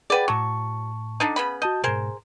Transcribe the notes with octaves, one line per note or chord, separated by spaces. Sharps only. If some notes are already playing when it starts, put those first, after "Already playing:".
G#4 B4 D5 F#5 G5
A2 F#3 A5 C#6
D3 D4 D#4
C#3 B3 B5
F#4 D#5 A5 G6
G#2 B2 G#4 A#4 C5